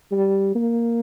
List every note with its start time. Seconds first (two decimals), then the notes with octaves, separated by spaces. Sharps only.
0.12 G3
0.55 A#3